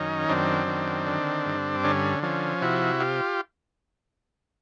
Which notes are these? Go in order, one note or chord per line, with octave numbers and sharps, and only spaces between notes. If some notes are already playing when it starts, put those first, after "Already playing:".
Already playing: F#2 D#3 C#4 D#4
F#2 C4 D4
D#3
D3
G2
D3 C#4
F3 C#4
C3 E4 F#4
F4 G4